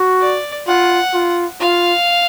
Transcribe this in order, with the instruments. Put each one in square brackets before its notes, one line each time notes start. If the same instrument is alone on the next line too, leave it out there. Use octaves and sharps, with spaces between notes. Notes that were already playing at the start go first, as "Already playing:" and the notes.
Already playing: [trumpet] F#4
[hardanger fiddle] D5
[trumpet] F4 [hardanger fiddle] F#5
[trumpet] F4
[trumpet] F4 [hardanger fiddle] F5